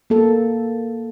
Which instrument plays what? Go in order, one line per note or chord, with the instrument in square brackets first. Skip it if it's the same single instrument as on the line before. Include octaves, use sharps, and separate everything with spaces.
[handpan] A#3 A4